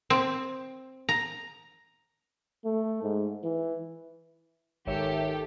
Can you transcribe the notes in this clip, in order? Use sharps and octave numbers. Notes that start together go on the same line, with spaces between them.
C4
A#5
A3
G#2
E3
G#1 D#3 G4 A4 C#5 E5